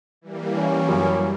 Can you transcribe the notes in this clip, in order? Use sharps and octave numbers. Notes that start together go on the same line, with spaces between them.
E3 G3 A#3
C#4
F#2